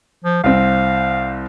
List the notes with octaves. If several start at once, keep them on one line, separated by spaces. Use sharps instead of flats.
F3
C2 C4 F5